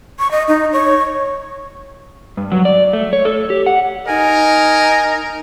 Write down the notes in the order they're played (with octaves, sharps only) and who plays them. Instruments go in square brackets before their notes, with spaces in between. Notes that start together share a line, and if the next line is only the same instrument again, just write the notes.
[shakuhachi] C#6
D#5
D#4
C#5
[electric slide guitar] G2
F#3
D5
A3
C#5
A4
G4
F#5
[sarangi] D#4 [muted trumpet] A#4 [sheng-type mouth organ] G#5